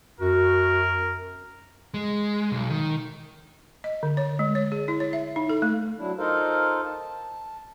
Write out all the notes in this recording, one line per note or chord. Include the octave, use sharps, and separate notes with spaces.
F#2 F#4 A#4
G#3
B1
D#3
D#5
D3
C#5
G#3
C#5
G#4
E4
C#5
E5
D#4
A4
A3
F#3 D4 E4
D#4 F4 A4 A#4 C5 F5
A5